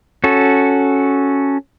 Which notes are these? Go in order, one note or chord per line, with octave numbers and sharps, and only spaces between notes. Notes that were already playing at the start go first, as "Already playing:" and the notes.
C#4 F#4 A4